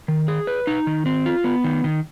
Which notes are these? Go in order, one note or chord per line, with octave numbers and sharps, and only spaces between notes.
D#3
G#4
B4
D#4
D#3
C4
F4
B3
D#3
D#3